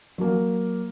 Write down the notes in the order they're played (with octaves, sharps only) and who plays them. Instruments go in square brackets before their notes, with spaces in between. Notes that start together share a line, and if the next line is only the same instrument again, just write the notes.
[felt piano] F#3 A#3